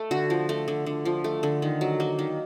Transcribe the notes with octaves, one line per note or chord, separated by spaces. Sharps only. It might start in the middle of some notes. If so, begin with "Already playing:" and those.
Already playing: A3
D3 F#4
F3
A3
D3
D3
F3
A3
D3
D#3
F#3
A#3
D#3